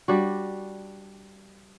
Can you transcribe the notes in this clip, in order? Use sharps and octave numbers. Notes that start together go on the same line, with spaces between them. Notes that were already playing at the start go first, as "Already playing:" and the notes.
G3 D4 F#4